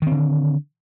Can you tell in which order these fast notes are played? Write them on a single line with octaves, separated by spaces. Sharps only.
D#3 C4 D3